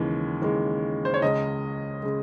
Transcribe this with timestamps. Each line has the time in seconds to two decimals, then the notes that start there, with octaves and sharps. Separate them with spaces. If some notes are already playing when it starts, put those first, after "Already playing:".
Already playing: D#2 C#3 E3 G#3
0.42 D#2 C#3 E3 G#3
1.05 C5
1.14 C#5
1.22 C#2 C#3 G#3 D#5
2.03 C#3 G#3